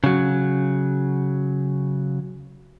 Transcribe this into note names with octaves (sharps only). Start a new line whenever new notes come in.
C#3 F#3